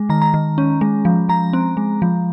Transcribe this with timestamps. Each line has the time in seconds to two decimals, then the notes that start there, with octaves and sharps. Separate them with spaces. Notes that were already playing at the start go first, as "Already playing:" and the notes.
Already playing: G#3
0.09 D#3 A#5
0.22 A#5
0.34 D#3
0.58 C#4
0.81 G#3
1.05 F3
1.29 F3 A#5
1.53 C4
1.77 G#3
2.02 F3